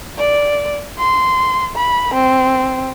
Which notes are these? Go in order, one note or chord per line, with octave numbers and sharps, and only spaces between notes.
D5
C6
B5
C4